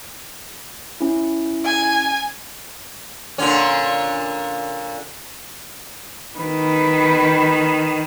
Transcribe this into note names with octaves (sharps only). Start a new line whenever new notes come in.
C#4 E4
G#5
A#2 D3 C#4
D#3 B4